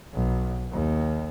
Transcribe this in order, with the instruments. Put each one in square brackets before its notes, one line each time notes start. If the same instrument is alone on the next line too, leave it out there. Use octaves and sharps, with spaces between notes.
[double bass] B1
D#2